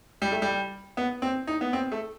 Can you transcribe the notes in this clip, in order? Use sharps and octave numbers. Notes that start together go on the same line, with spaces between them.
G3
A3
G3
B3
C4
D#4
B3
C4
A3